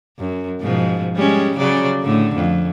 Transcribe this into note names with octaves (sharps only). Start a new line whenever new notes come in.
F#2
G#2 B2 F3
G3 G#3 C#4
C#3 F#3 D5
A2 D3
F2